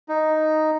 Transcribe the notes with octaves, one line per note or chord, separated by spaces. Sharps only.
D#4